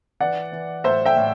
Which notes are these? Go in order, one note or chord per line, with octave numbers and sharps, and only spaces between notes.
E3 D5 F#5
E3
A2 C5 E5
E5 G5
A2